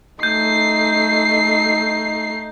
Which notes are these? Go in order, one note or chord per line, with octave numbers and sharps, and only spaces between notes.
A3 D#4 G6 C7